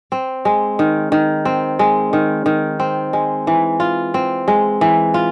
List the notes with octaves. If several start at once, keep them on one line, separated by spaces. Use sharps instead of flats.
C4
G#3
D#3
D#3
C4
G#3
D#3
D#3
C4
G#3
E3
F4
C4
G#3
E3
F4